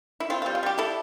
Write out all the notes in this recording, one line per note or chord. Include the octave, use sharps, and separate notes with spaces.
E4
C4 F4
F4
G3
F4
G3 G4
E4 A4